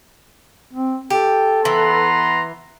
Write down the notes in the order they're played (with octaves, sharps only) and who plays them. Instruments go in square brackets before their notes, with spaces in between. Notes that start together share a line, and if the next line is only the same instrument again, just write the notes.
[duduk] C4
[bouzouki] G4 [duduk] A4
[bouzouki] E3 [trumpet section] B3 A#5 C6